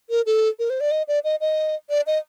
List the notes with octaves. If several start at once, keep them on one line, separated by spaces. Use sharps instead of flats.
A#4
A4
A#4
C5
D5
D#5
D5
D#5
D#5
D5
D#5